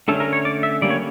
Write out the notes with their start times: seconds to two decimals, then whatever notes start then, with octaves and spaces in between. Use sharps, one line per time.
0.08 D3 A3 C#4 A4
0.20 A#4
0.33 C#5
0.45 D5
0.63 E5
0.81 D3 G3 A#3 C#4 D5
0.90 C#5